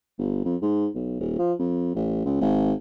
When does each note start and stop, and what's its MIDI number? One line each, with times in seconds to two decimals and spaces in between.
0.19 0.40 31
0.45 0.56 41
0.62 0.88 44
0.95 1.20 35
1.20 1.35 27
1.39 1.53 53
1.59 1.93 41
1.95 2.24 33
2.25 2.37 37
2.41 2.73 32